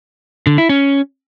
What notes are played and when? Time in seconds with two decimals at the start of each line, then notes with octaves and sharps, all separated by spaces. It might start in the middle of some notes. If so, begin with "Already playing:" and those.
0.47 D3
0.58 E4
0.69 C#4